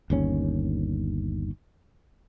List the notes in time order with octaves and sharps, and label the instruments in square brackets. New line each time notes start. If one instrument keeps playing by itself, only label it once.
[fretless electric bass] G1 D#2 C#4